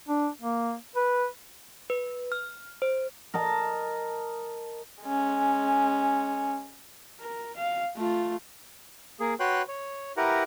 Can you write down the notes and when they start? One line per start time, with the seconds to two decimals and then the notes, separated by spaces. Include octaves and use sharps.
0.08 D4
0.41 A#3
0.96 B4
1.90 B4
2.32 F6
2.82 C5
3.34 A#4 D#5 A5
5.03 G#3 C#4
7.21 A#4
7.56 F5
7.97 A3 F4
9.20 A#3 G#4
9.40 F#4 B4 C#5 G5 C6 F#6
9.68 C#5
10.17 E4 G4 A#4 B4 F#5 A#5